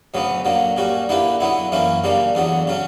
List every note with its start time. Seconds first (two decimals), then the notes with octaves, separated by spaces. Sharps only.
0.14 D2 C#3 F#3 B3
0.45 D3 F#3 A#3
0.77 A#2 G3 C#4 F#4
1.09 D3 A#3 E4 G4 B4
1.40 D3 F#3 B3 E4
1.72 F#2 E3 A#3 C#4 E4
2.04 C#3 G3 A#3 D4
2.35 E2 D3 F#3
2.67 C#3 F#3 C#4